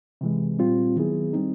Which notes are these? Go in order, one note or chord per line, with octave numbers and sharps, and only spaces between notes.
C3 E3 G#3
A#2 G3 C4 F4
D#3 F#3 B3 E4 G#4
G3 C4 D#4